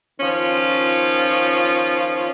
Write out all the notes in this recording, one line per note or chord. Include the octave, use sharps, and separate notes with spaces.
D#3 F3 C#4 F4